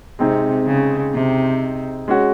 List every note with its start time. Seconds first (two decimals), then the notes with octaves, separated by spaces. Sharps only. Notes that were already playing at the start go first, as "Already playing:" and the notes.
0.19 C3 G#3 C4 D#4
0.66 C#3
1.14 C3
2.08 G#3 C#4 F#4